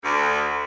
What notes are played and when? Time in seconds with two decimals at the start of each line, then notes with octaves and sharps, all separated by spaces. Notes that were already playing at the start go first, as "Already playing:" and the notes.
0.04 D2